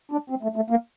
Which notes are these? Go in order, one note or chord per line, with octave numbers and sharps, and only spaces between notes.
D4
C4
A3
A3
A#3